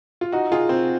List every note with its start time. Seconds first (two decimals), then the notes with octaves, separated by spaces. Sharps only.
0.21 F4
0.32 D#4 F#4
0.52 F4 G#4
0.69 C4